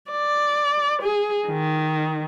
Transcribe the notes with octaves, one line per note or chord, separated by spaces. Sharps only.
D5
G#4
D#3